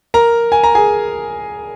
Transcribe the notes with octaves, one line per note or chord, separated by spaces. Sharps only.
A#4 A#5
G#5
A#5
G#4 G#5